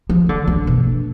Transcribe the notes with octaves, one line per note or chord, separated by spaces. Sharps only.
F3
D3
D3
B2